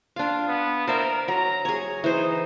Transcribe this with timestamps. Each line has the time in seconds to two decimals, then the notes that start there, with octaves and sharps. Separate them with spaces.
0.16 D4 F4 F5
0.48 B3
0.87 A#4 C5 D5 E5
1.28 F#3 A#5
1.65 G#4 C#5
2.04 E3 D#4 C5